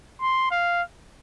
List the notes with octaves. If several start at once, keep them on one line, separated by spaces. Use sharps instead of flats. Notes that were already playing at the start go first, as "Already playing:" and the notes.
C6
F5